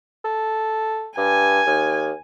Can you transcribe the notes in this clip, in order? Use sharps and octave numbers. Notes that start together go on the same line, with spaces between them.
A4
G2 G#5
D#2